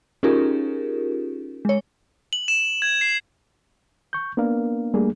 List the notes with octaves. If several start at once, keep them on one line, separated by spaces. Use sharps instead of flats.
C#4 D#4 F4 G4 G#4 A#4
G#3 C#5
F#7
E7
G#6
C7
C#6 G6
A#3 B3 D4 A#4 F5
G3 A3 A#3 D4 G#4